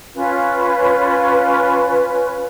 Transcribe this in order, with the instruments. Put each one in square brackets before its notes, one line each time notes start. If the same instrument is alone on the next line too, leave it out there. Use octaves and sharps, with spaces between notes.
[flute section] C#4 F4 B4